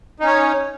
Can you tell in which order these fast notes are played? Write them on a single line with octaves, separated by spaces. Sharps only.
D#4 C#4 C#5